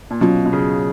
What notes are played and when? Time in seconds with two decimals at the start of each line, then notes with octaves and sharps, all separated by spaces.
0.11 A#2
0.21 B2 F#3 C#4 F4
0.45 B2
0.53 C#3